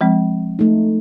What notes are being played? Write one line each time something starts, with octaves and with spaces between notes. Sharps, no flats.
F3 G#3 C4
A3 D#4